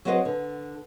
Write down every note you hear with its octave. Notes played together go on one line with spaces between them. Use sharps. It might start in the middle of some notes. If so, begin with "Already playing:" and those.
F#3 C4 F#4 B4 D#5
D3